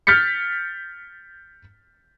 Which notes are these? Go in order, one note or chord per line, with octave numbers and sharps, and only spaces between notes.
F6 G6 A6 B6 C#7